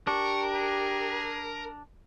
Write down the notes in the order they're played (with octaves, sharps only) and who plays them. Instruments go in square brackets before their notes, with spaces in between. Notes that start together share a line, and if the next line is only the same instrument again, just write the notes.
[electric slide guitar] D4 [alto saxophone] G4 [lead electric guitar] A#4 [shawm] C#6
[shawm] G#4